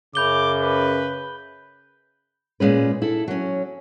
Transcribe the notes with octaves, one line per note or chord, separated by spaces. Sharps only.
F#2 C#3 B5 D6 G6 G7
B4
A#2 G#3 C#4 B4
E4 A4
F#3 C#4